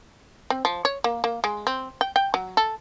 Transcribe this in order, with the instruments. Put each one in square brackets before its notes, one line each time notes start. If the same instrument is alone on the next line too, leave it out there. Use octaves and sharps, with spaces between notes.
[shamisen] C4
F3
C#5
A#3
A#3
G#3
C4
G5
G5
F#3
A4